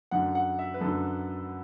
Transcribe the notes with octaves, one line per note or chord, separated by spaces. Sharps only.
F#2 D3 F#5
F#5
E5
B4
F#2 D3 A4